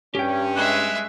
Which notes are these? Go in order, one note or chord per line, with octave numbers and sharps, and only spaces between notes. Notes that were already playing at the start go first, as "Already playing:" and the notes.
G2 C#4 G4 G5
G#3 E5 F#6